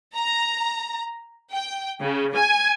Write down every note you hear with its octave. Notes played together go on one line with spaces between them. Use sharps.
A#5
G5
C#3
G#5